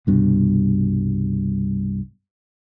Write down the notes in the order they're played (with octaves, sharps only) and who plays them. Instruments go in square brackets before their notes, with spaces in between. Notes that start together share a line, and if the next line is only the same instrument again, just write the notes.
[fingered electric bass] C2 G2 B2